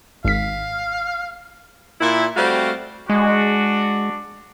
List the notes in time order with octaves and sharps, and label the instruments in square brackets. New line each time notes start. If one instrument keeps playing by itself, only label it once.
[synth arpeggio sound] G#1 B6 [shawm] F5
[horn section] A#2 E4
G3 A3 C4 F#4 F5
[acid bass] G#3 [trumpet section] D4 F#4